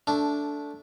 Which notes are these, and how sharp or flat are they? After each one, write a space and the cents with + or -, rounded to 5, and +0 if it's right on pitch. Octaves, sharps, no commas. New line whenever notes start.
A3 +0 D4 -15